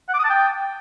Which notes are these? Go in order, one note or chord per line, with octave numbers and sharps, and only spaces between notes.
F#5
D6
D#6
A5
G5